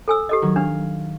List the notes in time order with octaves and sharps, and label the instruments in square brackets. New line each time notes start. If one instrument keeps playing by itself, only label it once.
[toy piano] A4 G#5 E6
G4 A4 D#5
[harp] D#3 F#3 G#6
[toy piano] D4 [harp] F5